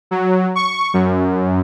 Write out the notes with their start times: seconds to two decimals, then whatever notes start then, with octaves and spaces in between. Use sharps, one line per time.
0.11 F#3
0.56 C#6
0.94 F#2